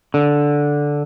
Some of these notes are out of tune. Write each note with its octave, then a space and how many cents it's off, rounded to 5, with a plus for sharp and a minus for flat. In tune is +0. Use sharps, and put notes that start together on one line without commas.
D3 -5